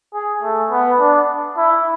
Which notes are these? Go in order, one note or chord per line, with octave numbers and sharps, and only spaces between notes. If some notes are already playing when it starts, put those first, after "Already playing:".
G#4
A3
B3
D4
E4